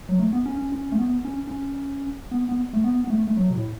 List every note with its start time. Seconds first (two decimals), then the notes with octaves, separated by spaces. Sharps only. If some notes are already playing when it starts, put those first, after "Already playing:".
0.09 F#3
0.19 A3
0.33 B3
0.46 C#4
0.59 C#4
0.72 C#4
0.92 A3
0.99 B3
1.25 C#4
1.47 C#4
2.31 B3
2.49 B3
2.73 A3
2.84 B3
3.04 B3
3.10 A3
3.27 A3
3.37 F#3
3.50 B2
3.55 A2